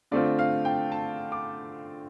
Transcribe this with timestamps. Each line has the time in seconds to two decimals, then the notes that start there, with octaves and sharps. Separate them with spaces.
0.11 D3 A3 C4 F4 D5
0.39 F5
0.65 G5
0.92 A5
1.32 D6